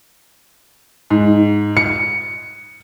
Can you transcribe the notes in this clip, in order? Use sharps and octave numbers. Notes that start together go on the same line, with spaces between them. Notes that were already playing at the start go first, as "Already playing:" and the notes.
G#2
C#7